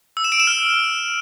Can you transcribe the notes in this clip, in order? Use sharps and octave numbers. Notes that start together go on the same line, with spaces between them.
E6
E7
D7
E7
F6